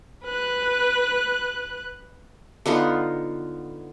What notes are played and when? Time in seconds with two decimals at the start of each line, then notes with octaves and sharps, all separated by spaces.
0.24 B4 F#6
2.66 D3 B3 D#4 F4